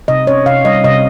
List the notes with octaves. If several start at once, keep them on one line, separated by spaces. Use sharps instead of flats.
C3 D#5
C#4 C#5
C3 F5
G3 D#5
C3 D#5